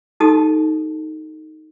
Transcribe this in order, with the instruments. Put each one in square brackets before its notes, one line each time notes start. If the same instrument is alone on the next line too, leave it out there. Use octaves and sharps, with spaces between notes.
[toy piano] D#4 F#4 G4 A4 A5 D#6